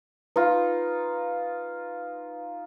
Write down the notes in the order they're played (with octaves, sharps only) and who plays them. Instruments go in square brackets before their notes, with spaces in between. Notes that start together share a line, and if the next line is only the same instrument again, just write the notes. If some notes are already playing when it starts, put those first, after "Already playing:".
[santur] D#4 F4 [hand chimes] B4